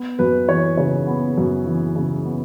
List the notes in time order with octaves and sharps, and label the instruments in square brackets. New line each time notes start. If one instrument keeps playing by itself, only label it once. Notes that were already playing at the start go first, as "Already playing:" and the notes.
Already playing: [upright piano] B3
F#2 B4
E3 C#5
C#3 C#5
B3
F#2
E3
C#3
B3